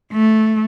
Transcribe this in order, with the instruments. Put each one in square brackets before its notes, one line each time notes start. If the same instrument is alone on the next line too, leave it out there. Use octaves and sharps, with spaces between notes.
[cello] A3